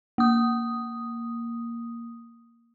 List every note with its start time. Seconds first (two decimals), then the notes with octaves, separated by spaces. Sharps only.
0.18 A#3 D#6